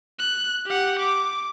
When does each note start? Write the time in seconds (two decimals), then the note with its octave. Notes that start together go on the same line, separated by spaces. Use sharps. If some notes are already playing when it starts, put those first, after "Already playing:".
0.19 F#6
0.66 G4 F#5
0.99 D6